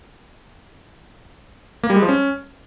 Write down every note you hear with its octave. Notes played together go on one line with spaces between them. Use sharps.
A#3
G3
G#3
F3
C#4